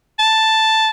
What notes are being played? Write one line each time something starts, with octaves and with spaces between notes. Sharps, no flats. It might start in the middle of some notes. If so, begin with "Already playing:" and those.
A5